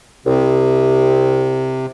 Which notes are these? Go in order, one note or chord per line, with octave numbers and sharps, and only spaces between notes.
C2 C3